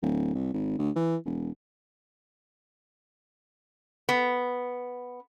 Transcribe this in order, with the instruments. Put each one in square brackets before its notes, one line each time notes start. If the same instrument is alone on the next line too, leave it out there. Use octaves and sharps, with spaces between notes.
[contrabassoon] D1
C2
G#1
D2
E3
E1
[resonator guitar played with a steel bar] B3